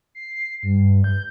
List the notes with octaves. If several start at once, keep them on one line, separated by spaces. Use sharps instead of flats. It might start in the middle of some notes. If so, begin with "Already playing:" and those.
C7
G2
G6